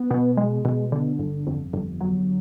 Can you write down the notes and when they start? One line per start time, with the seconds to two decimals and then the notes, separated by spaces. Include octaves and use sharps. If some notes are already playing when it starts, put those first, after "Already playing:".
Already playing: B3
0.11 B2
0.37 G#3
0.65 B2
0.92 D3
1.19 G1
1.47 F2
1.73 G1
2.01 F#3